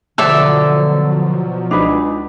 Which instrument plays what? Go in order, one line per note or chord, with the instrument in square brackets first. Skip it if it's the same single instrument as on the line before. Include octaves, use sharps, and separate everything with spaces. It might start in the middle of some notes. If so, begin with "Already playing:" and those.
[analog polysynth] B2 F3 F#3 [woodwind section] D3 [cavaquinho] A4 D5 E5
[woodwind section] C#2 [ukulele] D4 D#4 B4